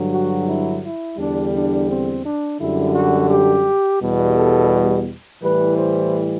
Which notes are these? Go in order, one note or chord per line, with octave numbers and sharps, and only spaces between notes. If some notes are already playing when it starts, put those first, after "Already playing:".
Already playing: G2 D3 F#3
F#4
E4
E4
E2 D3 G3 D4
D4
C4
D4
F#2 D3 G3 E4
F#4
G4
E2 B2 G3
A4
A2 E3 G3 B4
C5